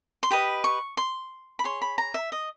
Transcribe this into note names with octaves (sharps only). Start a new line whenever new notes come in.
C6
G4 B4 D#5 B5
C#6
C6
B5
G#4 C#5 C6
B5
A#5
E5
D#5